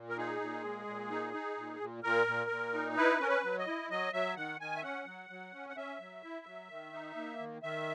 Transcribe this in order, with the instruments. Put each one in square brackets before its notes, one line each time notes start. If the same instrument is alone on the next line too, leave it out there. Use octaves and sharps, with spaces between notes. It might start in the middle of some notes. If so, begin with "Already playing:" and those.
Already playing: [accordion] A#2
A#4
D#4 G#4
A#2
G#3
A#2
D#4
D#4
A#2
A#2
A#2 A#4
A#2
A#2
D#4
E4 B4
C#4 A#4
B4
F#3
D#5
E4
F#3 D#5
F#3 E5
D#3 F#5
D#3 G#5
E5
C#4 F#5
F#3
F#3
C#4
F#5
C#4 E5
F#3
E4
F#3
D#3
D#4
A#3
D#3
D#3 E5